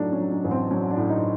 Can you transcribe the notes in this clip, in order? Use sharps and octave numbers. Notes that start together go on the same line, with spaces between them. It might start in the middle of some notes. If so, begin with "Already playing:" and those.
Already playing: A2 F#3 A3 D4 D#4
C#4
F#3
C#4
A1
C4
F#3 C#4
D4
A2
D#4